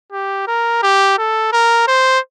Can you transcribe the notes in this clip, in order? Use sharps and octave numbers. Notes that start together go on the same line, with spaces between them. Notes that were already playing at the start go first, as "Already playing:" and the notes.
G4
A#4
G4
A4
A#4
C5